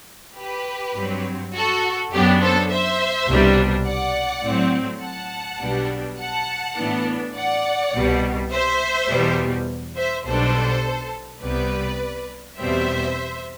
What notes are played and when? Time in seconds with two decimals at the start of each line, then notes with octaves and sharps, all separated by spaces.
0.37 G4 B4
0.97 G2 F#3 C4
1.54 F#4 A4
2.12 F#2 F#3 B3 D4 G4
2.42 A4 C5
2.70 C5 E5
3.28 C2 B2 G3 D4
3.86 D5 F#5
4.45 A2 F#3 C4
5.02 F#5 A5
5.60 B1 B2 G3 B3 D4
6.19 F#5 A5
6.77 A2 E3 B3 D4
7.35 D5 F#5
7.94 C2 B2 G3
8.51 C5 E5
9.09 E2 B2 G3
9.96 C5 E5
10.25 B1 B2 G3 D4 A4 C5
11.41 C2 C3 G3 B3 B4 D5
12.58 E2 B2 G3 C4 C5 E5